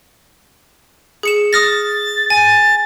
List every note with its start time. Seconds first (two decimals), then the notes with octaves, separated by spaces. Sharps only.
1.23 G#4 C#7 E7
1.53 D#6 F6 A6 A#6
2.30 G#5 A6